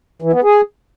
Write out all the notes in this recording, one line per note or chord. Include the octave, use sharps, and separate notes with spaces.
E3
B3
G#4